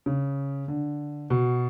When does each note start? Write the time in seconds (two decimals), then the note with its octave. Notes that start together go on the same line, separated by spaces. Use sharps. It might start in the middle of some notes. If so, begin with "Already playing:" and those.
0.06 C#3
0.68 D3
1.30 B2